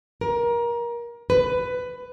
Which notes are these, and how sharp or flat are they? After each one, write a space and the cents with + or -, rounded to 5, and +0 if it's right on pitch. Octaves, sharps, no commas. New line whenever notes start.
A#4 +25
B4 +15